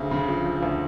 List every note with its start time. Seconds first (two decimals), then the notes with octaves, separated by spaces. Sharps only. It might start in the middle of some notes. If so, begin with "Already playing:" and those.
Already playing: D2 C#3
0.11 C#3
0.28 F3
0.46 F3
0.63 D2